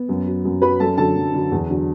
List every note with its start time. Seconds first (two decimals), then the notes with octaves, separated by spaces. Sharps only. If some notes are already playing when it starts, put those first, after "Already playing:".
Already playing: B3
0.09 F#2
0.26 F#3
0.45 F#2
0.62 F#3 B4 B5
0.80 F#2 A4 A5
0.98 D3 F#3 A4 A5
1.16 F#2
1.34 D3 F#3
1.52 E2
1.70 D3 F#3